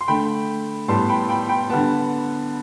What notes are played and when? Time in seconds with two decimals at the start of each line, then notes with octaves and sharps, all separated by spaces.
0.01 C6
0.08 D3 A3 G5 B5
0.88 A2 G3 B3 A5 C6
1.09 G5 B5
1.29 G5 B5
1.49 G5 B5
1.70 D3 G3 B3 F#5 A5